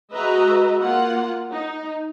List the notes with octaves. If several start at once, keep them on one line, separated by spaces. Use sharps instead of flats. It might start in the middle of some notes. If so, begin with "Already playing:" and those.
G#3 F#4 B4 D#5 E5 A#5
A#3 F4 F#5
D#4